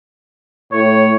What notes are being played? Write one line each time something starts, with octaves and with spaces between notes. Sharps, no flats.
A2 C#5